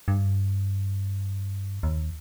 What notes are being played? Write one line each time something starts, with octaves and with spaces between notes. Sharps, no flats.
G2
D#2